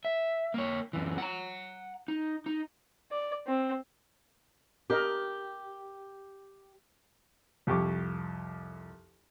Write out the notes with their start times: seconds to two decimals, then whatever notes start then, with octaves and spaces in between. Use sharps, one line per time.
0.05 E5
0.54 A#3 C#5
0.93 F#2 E3
1.18 F#5 A#5
2.08 D#4
2.46 D#4
3.12 D5
3.47 C4
4.90 D4 G4 A#4 D#5
7.67 C2 F2 G4 C#6 D6